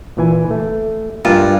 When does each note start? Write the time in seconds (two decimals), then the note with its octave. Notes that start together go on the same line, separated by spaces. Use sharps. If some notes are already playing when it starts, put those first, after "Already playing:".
0.17 A#2 E3 G#5
0.51 A3
1.25 G2 F4 A#4 E5 G#5